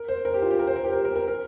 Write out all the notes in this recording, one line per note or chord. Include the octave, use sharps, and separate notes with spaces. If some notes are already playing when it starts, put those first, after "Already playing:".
Already playing: A#4
C5
A#4
G4
F4
G4
A#4
C5
A#4
G4
A#4
A#4
A#4
A#4